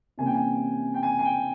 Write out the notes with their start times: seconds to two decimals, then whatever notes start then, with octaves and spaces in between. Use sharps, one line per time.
0.18 C3 E3 G3 A#3 C#4 G#5
0.26 G5
0.34 G#5
0.94 G5
1.03 G#5
1.19 G#5
1.25 G5